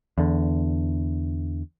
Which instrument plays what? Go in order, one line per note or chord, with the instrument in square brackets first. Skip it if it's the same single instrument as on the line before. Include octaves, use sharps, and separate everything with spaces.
[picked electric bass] E2 D3